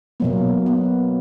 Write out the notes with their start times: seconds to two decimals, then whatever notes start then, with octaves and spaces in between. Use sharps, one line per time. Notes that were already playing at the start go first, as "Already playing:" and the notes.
0.20 B2 F#3 A#3 B3
0.66 B3